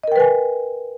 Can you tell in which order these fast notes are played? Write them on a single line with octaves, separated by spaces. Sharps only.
D#5 A#4 G5 B4 G#5